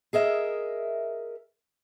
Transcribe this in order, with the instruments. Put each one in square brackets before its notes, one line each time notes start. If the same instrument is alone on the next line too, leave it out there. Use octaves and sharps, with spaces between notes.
[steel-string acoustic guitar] G#4 A#4 D#5 E5